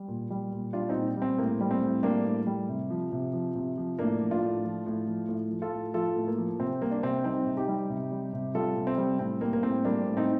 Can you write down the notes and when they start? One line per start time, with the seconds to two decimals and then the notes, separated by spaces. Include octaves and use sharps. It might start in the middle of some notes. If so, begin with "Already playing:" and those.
Already playing: G3
0.08 A#2
0.30 G3
0.52 A#2
0.73 G3 D4 F4
0.89 C4 D#4
0.95 A#2
1.17 G3
1.22 C4
1.38 A2 A#3
1.61 G3
1.71 C4
1.82 A2
2.03 G3 A#3 D4
2.26 A2
2.47 G3
2.69 C3
2.90 F3
3.12 C3
3.33 F3
3.55 C3
3.78 F3
3.99 A2 A#3 D4
4.21 F3
4.31 D4 F4
4.42 A2
4.64 F3
4.86 A2
5.08 F3
5.29 A2
5.51 F3
5.62 F4 A4
5.72 A2
5.94 F3 F4 A4
6.16 A2
6.27 A#3
6.38 F3
6.59 C3 C4
6.81 G3 A#3
6.91 D4
7.03 C3 C4
7.24 G3 C4 D#4
7.46 C3
7.57 D#4 G4
7.68 G3
7.90 C3
8.12 G3
8.33 C3
8.55 G3 F4 A4
8.77 C3
8.87 C4
8.97 G3
9.19 A2 C4
9.41 G3 A#3
9.53 A#3
9.63 A2 C4
9.85 G3 A#3 D4
10.06 A2
10.17 C4 D#4